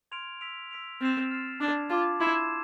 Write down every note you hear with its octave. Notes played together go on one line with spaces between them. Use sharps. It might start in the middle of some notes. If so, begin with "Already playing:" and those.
C6 F6 G#6 D7 F7
E6 B6 D7 F7
E6 B6 D7 F7
C4 F6 A6 C7 E7
F6 A6 C7 E7
D4 A5 D6 G#6
F4 A5 D6 G#6
E4 C6 E6 G#6 C7 E7